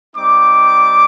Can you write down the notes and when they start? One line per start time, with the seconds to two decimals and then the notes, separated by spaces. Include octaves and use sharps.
0.16 G3 C4 D#4 D6